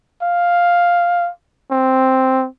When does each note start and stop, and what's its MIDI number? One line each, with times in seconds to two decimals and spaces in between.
0.22 1.30 77
1.71 2.47 60